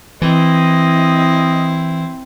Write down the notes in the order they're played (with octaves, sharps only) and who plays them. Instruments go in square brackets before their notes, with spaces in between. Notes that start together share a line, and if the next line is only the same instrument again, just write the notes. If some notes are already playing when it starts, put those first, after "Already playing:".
[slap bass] E3 [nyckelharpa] C4 E4 [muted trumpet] D#5